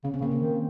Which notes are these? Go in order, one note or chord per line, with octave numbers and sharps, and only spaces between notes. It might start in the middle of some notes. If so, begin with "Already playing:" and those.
C#3 C#4
C4
C#3 A#3
C4
D#3